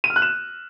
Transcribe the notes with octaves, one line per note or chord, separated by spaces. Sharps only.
D#7
F6
F#6
E7